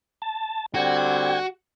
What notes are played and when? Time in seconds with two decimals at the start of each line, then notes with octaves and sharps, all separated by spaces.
0.22 A5
0.74 D3 G3 C4 F#4 G5 G#6